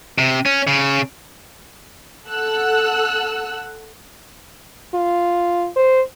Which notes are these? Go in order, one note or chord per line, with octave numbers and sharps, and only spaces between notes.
C3
C#4
C#3
A4 F#5 E6 F#6
F4
C5